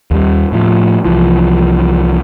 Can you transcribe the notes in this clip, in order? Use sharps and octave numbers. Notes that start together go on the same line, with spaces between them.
D#2 G3
A2 F3
C2 E3 F3